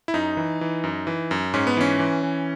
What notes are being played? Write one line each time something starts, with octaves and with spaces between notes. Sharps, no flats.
E4
F#2 D#4
E3
E3
F#2
E3
F#2
G#2 C#4
B3
E3 C#4
E3
E3